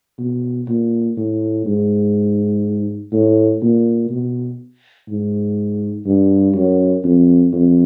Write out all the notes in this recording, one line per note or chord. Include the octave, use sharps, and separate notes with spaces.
B2
A#2
A2
G#2
A2
A#2
B2
G#2
G2
F#2
F2
F2